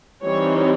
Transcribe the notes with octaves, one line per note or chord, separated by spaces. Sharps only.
E3 G3 C4 D#4 C#5